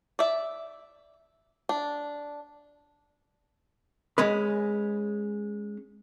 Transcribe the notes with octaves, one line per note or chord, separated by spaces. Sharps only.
D5 E5
D4
G#3 C#4 B4